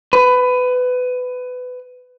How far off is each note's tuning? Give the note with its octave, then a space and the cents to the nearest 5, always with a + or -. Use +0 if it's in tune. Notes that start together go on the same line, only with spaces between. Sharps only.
B4 +20